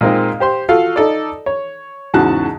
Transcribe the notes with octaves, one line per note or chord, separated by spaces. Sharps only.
A#2 G#3 A#3 C4 D#4
G4 C5 C6
F4 F#4 A4 F5
D#4 A4 D5
C#5
E2 G#2 C#3 F#4 A5 F#6